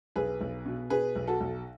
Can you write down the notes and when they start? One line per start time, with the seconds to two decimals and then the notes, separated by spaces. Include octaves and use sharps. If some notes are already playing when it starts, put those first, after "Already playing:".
0.16 B1 G#4 B4
0.41 B1
0.66 B2
0.90 B2 G#4 B4
1.16 B1
1.27 F#4 A4
1.41 B1